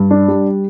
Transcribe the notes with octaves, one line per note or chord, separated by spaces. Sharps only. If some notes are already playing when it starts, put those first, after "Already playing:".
Already playing: G2
D4
G3